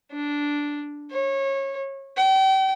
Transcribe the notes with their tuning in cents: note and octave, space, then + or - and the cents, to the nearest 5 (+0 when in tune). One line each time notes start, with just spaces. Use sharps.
D4 -5
C#5 -25
G5 -35